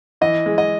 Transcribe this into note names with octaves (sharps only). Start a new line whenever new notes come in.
E3 D#5
G#3
D#5